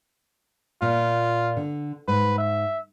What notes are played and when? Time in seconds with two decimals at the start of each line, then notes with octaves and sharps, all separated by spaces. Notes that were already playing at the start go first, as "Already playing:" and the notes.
0.82 A#2 F4
1.57 D3
2.08 G#2 B4
2.38 E5